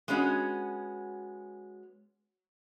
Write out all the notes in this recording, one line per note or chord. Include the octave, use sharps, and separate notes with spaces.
G#3 B3 C#4 F#4